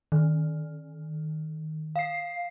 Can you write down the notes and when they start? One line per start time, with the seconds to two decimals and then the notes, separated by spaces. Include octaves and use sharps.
0.12 D#3
1.96 F5 C7